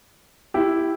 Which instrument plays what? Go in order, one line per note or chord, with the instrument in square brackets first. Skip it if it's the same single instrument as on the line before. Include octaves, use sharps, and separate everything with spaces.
[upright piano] E4 G4